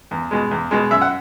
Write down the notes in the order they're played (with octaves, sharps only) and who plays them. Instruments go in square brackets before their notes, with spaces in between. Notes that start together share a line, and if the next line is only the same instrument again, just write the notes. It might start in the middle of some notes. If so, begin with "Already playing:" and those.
[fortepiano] E2
B2 G#3
E2
B2 G#3
F#2 E5
F#5